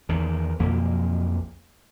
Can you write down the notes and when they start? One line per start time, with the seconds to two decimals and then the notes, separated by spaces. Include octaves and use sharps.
0.09 E2 D#3
0.59 B1 F2 F3 A#3